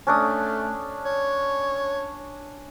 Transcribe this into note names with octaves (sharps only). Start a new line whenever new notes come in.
A3 C#4 D4 D#6
C#5